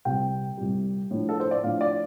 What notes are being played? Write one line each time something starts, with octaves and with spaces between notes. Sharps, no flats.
C2 C3 G3 G5
C2 C3 G3
A2 F3 D4
A4
C5
D5
A2 F3 D4 F5
D5